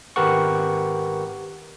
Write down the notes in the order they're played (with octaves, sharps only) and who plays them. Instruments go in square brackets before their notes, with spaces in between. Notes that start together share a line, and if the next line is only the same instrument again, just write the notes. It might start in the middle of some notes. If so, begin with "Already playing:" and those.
[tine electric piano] G#1 G4 A#4 B4 F#5 C#6